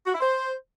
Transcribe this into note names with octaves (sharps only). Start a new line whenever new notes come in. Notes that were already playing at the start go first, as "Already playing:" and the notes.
F#4
E4
C5